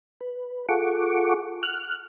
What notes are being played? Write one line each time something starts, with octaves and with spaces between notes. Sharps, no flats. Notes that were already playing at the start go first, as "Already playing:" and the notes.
B4
F4 G#4 A4 F#5 C#6 D6
F6 F#6